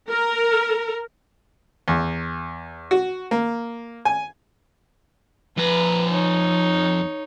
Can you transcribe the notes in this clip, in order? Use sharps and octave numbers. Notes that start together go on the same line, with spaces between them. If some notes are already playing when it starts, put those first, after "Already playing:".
A#4
E2
F#4
A#3
G#5
F2 B4 A#5
D#4 C#5